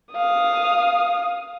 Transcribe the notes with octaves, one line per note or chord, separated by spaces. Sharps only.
F5 D#6